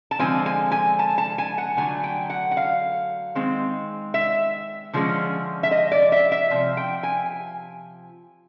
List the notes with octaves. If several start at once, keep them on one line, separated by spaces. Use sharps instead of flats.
A5
D3 F3 G#3 C4 G#5
G#5
G#5
A5
A5
G#5
F#5
D3 F#3 A3 G#5
G5
F#5
F#5
F5
D#3 G#3 C4
E5
D3 F3 G#3 C#4
E5
D#5
D5
E5
E5
C3 F3
G5
G#5